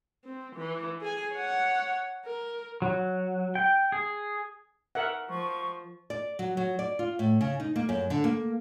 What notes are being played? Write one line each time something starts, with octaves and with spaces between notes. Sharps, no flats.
C4
E3
G#4 G#5
C#5 F#5
A#4
F#3
G5
G#4
A#4 E5 F#5
F3 C#6
D5
F#3
F#3
D5
F4
A2
C#3
D#4
A#3
F#2
D3
A#3